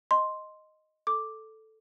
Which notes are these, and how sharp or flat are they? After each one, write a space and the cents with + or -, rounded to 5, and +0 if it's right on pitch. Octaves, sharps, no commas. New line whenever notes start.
D#5 +0 C6 +0
A4 +0 D6 +0